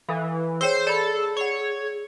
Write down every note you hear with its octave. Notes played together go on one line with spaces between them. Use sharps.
E3 A4 F5
G#4 C5 C#5 G5 E6
A4 D5 B5
C#5 F#5 C#6